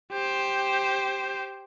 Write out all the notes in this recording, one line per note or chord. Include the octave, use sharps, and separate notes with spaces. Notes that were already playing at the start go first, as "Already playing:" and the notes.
G4 C5